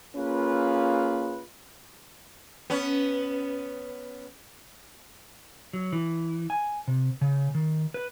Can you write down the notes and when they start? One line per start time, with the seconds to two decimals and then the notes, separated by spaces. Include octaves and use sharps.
0.16 A#3 C#4 F4 G#4 B4
2.70 B3 C#4
5.73 F#3
5.93 E3
6.50 G#5
6.88 C3
7.21 C#3
7.55 D#3
7.94 B4